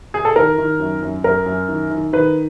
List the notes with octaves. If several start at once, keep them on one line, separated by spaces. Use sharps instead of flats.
G#4
A4
D#3 A#4
D#3
F#2
F#2
F#2 A#4
F#2
D#3
D#3
D#3 B4